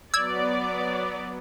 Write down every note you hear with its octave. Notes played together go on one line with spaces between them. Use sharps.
F#3 B3 D5 E6 G#6